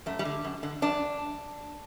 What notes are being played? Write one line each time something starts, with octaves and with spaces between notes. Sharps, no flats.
F#2 A3
G3
D3
F#2
D3
F#2 D4